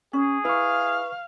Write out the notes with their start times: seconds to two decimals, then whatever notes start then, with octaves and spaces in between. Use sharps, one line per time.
0.13 C#4 G#4
0.45 E4 B4 F5 C#6